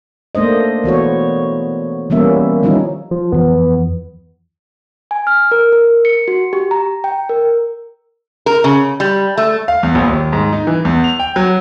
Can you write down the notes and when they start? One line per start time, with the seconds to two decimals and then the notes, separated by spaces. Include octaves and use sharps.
0.35 A3 A#3 D4 C5 D#5
0.84 E3 B3 F#4 C#5
2.10 E3 G3 A#3 B3 C#4 E5
2.63 D#3 F3 G3 C#4 D#4 E4
3.11 F3
3.32 F2 E3 F3 B3
5.11 G#5
5.27 F6
5.51 A#4
5.73 A#4
6.05 C#7
6.28 F#4
6.53 G4
6.71 A#5
7.04 G5
7.29 A#4
8.46 A#4
8.64 C#3
9.00 G3
9.38 A3
9.68 F5
9.83 E2
9.95 A#1
10.08 D#2
10.33 G#2
10.53 D#4
10.67 E3
10.85 E2
11.04 F7
11.19 G5
11.36 F#3